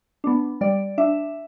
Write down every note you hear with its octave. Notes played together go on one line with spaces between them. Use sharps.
B3 D4
G3 D5
D4 E5